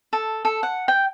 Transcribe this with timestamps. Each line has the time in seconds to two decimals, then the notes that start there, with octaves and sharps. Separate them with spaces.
0.13 A4
0.45 A4
0.63 F#5
0.88 G5